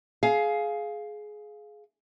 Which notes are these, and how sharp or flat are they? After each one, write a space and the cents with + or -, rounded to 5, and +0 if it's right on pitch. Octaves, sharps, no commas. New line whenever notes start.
G#4 +20 F5 +0